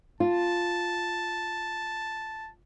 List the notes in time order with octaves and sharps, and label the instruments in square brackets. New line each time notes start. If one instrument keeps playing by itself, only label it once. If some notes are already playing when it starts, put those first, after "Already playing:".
[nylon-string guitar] F4 [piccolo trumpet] A5